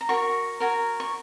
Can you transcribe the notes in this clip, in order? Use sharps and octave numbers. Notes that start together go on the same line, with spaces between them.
A#5
F#4 A#4 C#5 C#6
F#4 A#4 C#5
C#6